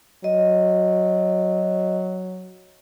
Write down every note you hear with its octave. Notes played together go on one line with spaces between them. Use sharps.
F#3 D#5